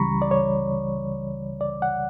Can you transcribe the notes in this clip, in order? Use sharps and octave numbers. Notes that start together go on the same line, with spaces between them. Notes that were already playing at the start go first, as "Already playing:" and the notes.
Already playing: C#2 C#3 E3 G3 A#5 B5 C#6
D5
C#5
D5
F#5